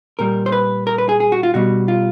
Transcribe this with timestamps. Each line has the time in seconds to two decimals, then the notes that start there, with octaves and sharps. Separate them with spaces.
0.19 A#2 G3 A#4
0.46 C5
0.52 B4
0.87 A#4
0.98 B4
1.09 G#4
1.20 G#4
1.32 F#4
1.43 F4
1.54 B2 G3 F#4
1.88 F4